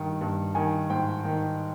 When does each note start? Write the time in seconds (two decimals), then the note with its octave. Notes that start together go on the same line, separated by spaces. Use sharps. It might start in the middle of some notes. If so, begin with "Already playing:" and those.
Already playing: G2 D#3
0.21 G2
0.55 D#3 G#5
0.89 G#2 G5
1.25 D#3